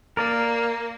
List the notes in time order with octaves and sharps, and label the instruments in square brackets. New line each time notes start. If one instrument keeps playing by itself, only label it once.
[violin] A#3 [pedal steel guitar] A#4 D5